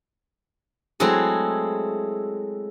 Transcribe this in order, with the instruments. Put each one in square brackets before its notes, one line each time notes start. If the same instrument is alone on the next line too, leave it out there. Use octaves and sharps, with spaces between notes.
[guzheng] F#3 G#3 A3 C4 E4 G#4